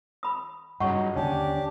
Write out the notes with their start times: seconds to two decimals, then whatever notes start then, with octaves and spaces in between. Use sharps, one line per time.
0.23 B5 D#6
0.80 G2 C#3 F#3 D#4 F#5 C#6
1.16 D#2 D3 C#4 D4 G4